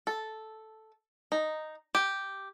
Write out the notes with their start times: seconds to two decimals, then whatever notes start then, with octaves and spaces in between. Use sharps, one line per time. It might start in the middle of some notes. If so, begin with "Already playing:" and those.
0.07 A4
1.32 D#4
1.95 G4